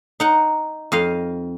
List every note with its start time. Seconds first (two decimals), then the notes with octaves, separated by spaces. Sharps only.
0.20 D#4 F#5
0.92 F2 D#5 F5